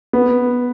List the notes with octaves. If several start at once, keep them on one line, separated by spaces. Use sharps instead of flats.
B3